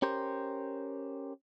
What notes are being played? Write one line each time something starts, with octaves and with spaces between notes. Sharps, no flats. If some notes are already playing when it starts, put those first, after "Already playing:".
C#4 G4 A#4 C5